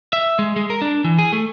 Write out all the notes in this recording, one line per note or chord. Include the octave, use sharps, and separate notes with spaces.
E5
G#3
G#3
A#4
D4
E3
G#4
A3